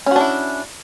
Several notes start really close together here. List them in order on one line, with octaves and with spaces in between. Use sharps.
C#4 F#4 D4 E4